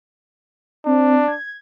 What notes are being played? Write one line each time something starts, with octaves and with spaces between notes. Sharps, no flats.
C4 D4
G#6